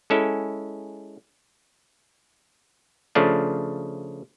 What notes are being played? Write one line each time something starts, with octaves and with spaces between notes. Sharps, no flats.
G#3 C#4 E4 A4
C#3 F3 A3 D4